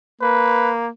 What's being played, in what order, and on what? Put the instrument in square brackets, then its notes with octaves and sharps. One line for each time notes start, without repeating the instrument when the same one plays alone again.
[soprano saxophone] A#3 [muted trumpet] B4